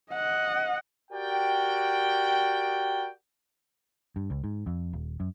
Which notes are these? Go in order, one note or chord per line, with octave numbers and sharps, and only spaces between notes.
D#5 F#5
F#4 G4 A#4 D5 G5
G2
C#2
G#2
F2
D#1
F#2